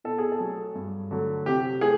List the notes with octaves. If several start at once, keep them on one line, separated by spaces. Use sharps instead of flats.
B2 A4
G#4
A4
F#3 A3
G2
D3 F#3 A3
C3 G4
A3 G#4